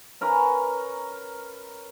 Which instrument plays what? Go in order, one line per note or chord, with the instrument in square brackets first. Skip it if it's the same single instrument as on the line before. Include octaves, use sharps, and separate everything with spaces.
[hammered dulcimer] C#4 A#4 B4